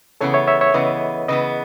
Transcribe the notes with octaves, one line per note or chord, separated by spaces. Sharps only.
C#3 E3 B3 A4 C#5
C#5 E5
C#5 E5
C#5 E5
C#3 E3 B3 B4 D#5
C#3 E3 B3 B4 D#5